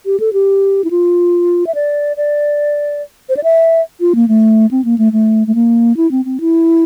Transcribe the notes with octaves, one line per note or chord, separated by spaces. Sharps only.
G4
A4
G4
E4
F4
E5
D5
D5
C5
D5
E5
F4
A#3
A3
C4
A#3
A3
A3
A3
A#3
E4
C4
C4
E4